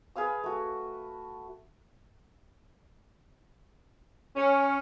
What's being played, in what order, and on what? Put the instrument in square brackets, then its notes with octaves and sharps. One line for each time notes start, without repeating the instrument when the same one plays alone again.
[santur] G#4 B4 F5 E6
A3 F#4
[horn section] C#4